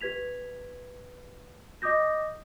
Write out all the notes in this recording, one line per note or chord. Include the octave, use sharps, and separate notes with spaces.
G4 B4 G#6 B6 F7
D#5 D6 D#6 G6 A#6